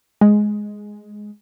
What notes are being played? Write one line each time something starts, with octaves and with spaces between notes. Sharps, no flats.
G#3